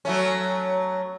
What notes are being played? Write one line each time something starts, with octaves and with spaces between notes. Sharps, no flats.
F#3 A3 C#4